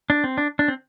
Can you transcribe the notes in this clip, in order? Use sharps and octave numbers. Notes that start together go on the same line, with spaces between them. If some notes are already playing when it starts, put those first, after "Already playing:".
D4
C4
D4
D4
C4